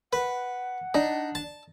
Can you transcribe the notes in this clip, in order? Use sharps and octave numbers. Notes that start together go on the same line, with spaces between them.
B4 F#5
D4 D#4
A5